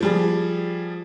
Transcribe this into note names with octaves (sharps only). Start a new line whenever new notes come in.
F3 G3 G#4